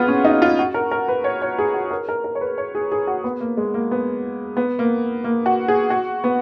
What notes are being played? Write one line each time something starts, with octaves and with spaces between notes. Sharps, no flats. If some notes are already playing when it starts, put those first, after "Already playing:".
Already playing: B3 F4 F#4 G#4
C#4
D#4
F4
F#4
A#4
A#4
B4
C#5
C#5
G#4
F#4
A#4
A#4
A#4
C#5
B4
C#5
G#4
G#4
F#4
B3
A#3
G#3
A#3
B3
B3
A#3
A#3
F#4
G#4
F#4
B3